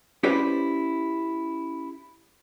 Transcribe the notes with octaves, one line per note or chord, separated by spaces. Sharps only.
C#4 E4 G4 B4 C5 D5